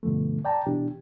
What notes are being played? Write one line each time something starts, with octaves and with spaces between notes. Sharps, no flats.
G2 B2 D3 F3 A3
D5 G5 A5 A#5
B2 E3 D4 G4